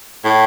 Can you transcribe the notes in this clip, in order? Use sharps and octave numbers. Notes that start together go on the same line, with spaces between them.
A2